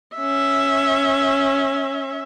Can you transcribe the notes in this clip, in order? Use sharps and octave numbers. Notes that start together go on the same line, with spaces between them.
C#4 E5